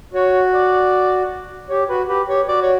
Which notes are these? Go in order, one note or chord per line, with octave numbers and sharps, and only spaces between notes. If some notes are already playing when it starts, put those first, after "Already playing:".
F#4 C#5
D5
G4 C#5
F#4 B4
G4 B4
G4 C#5
F#4 D5
C#5